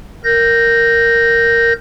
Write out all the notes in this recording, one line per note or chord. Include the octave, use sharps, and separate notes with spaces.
A#4 G6 A#6